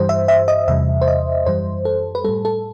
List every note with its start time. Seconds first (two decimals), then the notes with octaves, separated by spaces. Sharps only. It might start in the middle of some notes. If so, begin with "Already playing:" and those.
Already playing: G2 E3 G3 C5
0.09 E5
0.28 E5
0.48 D#5
0.68 E2 C3 E3 G3 E5
1.02 C5
1.08 D#5
1.46 F#2 E3 G3 C5
1.85 A4
2.15 B4
2.24 A2 G3 A4
2.45 A4